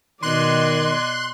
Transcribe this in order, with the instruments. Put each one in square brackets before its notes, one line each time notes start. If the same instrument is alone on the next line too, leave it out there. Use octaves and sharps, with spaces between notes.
[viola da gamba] B2 B3 [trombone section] D#3 [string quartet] D5 D#5 G#6 [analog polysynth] C6 F#6